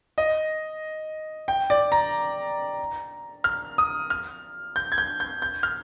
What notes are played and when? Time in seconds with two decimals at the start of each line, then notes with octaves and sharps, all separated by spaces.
0.18 D#5
1.48 G5
1.70 D5
1.92 A#5
3.44 F6
3.78 D#6
4.10 F6
4.76 G6
4.92 G#6
4.98 G6
5.20 G6
5.42 G6
5.63 F6